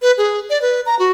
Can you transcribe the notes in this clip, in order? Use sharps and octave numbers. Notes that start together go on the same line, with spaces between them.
B4
G#4
D5
B4
A#5
F#4